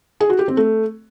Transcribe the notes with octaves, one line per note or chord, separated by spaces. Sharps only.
G#4
F#4
G4
C4
A3